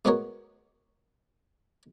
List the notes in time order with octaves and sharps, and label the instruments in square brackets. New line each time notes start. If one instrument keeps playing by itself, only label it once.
[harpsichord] G#3 B3 F#4 A#4 C#5